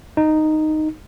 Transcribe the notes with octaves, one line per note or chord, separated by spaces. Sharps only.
D#4